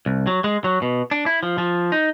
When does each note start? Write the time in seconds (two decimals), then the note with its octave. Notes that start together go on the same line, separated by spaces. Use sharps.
0.06 C2
0.27 F#3
0.44 G#3
0.64 F#3
0.82 B2
1.11 D4
1.26 E4
1.43 F3
1.58 F3
1.92 D#4